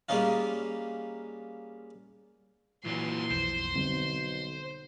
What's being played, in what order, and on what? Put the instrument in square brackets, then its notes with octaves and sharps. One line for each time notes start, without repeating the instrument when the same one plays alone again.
[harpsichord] G3 G#3 A#3 C#4 D#4 F4
[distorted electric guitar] A#2 F#3 [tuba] E3 [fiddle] C6
[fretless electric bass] B1 F2 [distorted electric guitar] C5
[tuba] B1 [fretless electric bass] D3 G3 C4